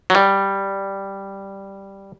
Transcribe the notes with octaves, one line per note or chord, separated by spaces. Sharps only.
F#3
G3